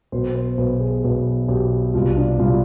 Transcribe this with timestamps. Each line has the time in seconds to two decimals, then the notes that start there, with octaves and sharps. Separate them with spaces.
0.12 B1 B2 C5
0.35 C5
0.58 B1 B2 B4
0.80 G#4
1.03 B1 B2 B4
1.48 B1 B2 G4
1.94 C2 B2 F4
2.16 D4
2.39 C2 B2 F4